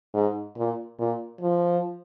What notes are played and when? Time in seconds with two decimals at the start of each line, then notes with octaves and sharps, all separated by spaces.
0.14 G#2
0.57 A#2
0.99 A#2
1.41 F3